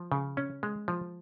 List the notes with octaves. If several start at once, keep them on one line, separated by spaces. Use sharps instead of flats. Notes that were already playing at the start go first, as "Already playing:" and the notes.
Already playing: F3
C#3
C#4
G#3
F3